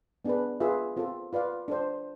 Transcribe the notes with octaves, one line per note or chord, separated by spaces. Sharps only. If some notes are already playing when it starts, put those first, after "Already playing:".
B3 D4 G#4 B4
F4 G#4 B4 E5
C4 F4 A4
F4 B4 D5 F5
D4 A4 C5